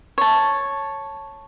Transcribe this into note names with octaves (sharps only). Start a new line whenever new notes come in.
C#5 A5